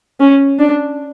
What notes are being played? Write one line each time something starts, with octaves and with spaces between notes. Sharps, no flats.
C#4
D4